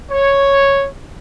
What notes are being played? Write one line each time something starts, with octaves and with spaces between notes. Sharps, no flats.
C#5